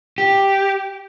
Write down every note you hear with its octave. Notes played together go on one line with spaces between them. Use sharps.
G4